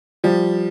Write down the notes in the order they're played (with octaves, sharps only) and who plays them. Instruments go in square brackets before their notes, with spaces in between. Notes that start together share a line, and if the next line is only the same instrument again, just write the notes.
[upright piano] F3 [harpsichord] G3